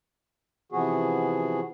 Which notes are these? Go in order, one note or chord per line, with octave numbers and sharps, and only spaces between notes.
C3 E3 F3 B3 F#4 G#4